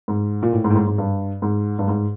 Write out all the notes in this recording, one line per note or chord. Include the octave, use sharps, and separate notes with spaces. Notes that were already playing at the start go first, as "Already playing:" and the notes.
G#2
A#2
A2
G#2
A2
G#2
G#2
G2
G#2
G2
G#2